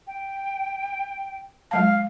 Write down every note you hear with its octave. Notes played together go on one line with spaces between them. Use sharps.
G5
F#3 G#3 F5 A5